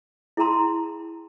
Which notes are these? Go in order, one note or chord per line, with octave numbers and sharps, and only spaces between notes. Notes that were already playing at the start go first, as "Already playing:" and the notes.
E4 G#4 G5 A5 A#5 C6